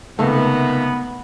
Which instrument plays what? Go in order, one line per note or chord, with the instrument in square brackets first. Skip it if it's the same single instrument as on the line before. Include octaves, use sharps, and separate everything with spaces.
[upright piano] C#2 C3 D#3 [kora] A3 [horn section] B3